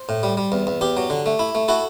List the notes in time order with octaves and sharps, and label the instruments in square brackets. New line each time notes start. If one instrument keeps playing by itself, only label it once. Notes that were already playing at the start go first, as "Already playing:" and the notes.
Already playing: [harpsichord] C5
A2
G3
G3
E2
E2
E2 G4
F#3
D3
A3
E4
A3
E4 F#4 A4